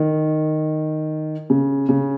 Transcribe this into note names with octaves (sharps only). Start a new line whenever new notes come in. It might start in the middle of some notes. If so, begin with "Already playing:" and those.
Already playing: D#3
C#3
C#3